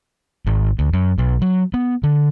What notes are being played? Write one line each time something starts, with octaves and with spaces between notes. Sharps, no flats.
G#1
D2
F#2
B1
F#3
B3
D3